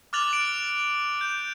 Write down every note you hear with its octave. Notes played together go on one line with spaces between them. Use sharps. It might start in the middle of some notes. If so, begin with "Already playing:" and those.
D6 F6 F#6 A6 F7 F#7
D7
G6